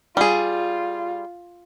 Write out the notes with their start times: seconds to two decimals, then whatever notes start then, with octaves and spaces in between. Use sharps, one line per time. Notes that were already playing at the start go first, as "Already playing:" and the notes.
0.17 G3 F4 G#4